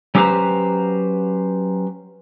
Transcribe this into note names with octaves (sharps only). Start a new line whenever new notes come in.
F#3 C#4 G4 B4 C5 A#5